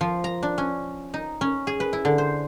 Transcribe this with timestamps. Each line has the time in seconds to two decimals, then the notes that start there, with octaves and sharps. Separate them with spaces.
0.01 F3
0.24 A#5
0.43 D4
0.58 C#4
1.14 D#4
1.41 C#4
1.67 G#4
1.80 B4
1.93 E4
2.05 D3
2.18 C5